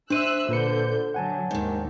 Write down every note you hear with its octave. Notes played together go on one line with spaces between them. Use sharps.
D4 C5 E5 E6 F#6 D#7
A#2 D3 B4 G6 C#7
D3 F#3 F#5 G#5 A5
D#2 G#2 D#3